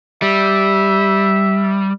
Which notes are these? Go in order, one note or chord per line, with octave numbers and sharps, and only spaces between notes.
G3 E5